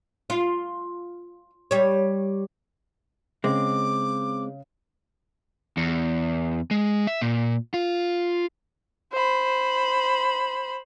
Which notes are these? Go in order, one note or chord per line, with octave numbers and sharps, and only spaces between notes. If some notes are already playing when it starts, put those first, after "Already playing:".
F4
G3 C#5
C#3 G#3 C4 D6
E2
G#3
E5
A#2
F4
C5 B5